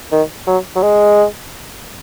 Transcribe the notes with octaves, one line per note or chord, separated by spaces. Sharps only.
D#3
F#3
F#3
G#3